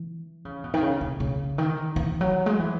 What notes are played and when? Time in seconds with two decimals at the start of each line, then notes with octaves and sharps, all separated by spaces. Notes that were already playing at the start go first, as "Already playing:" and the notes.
Already playing: E3
0.45 C#3
0.64 B2
0.74 D#3
0.82 C#3
1.01 C#3
1.20 C#3
1.58 D#3
1.96 E3
2.21 F#3
2.46 G#3
2.60 E3